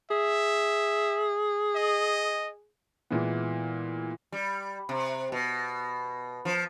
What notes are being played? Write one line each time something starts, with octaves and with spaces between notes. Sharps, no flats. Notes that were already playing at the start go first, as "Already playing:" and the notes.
G#4 E5
D#5
A#2 E3 G#3 B3
G3
C3
B2
F3